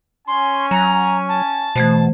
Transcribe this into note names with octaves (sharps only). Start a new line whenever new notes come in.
C#4 G#5 C6
F#3 A#5
A5
B2 E3 A3 C5